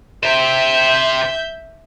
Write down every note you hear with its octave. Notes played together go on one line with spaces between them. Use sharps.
G4 C5 E5 G6